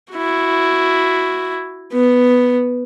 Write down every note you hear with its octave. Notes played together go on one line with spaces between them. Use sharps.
E4 F#4
B3